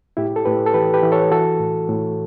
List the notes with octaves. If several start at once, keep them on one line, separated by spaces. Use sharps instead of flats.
A2 E4 G4
A4
A2 G4 B4
A4
E3 G4 B4
G4 B4
E3
A4 C#5
E3 F#4 A4
A2
A2